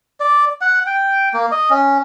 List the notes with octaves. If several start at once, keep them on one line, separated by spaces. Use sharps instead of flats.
D5
F#5
G5
A#3
D#5
C#4